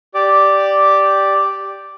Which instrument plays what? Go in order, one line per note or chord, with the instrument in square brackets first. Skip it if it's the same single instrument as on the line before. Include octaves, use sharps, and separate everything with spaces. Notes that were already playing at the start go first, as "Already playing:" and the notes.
[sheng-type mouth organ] G4 D5 D6